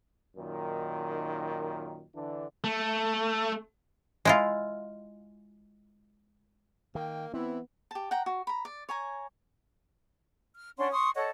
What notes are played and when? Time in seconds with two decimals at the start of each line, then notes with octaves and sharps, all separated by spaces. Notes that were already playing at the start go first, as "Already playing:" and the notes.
0.36 F#2 A#2 D#3
2.14 D3 E3 D4
2.64 A3
4.25 G#3 E4 F4
6.95 D#3 A#3 G5
7.34 E3 B3 C4 E4
7.91 G4 A5
8.11 F#5 G5 A#5
8.26 F#4
8.47 A#5 B5
8.65 D5
8.89 C#5 G#5 A#5
10.54 F6
10.78 C#4 D4 F#5 C6
10.91 C6 C#6 D#6
11.15 A4 C#5 D#5 F#5